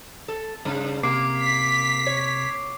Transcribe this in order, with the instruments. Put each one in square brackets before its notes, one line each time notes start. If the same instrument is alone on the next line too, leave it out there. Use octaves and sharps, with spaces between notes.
[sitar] A4
G2 C#3
[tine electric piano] C3 [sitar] A#3 [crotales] D6 C7 D7
[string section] B6
[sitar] C#5